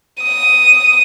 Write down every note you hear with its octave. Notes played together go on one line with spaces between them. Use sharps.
D#6